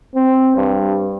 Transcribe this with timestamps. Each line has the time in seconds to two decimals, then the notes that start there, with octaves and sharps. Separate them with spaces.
0.16 C4
0.57 G2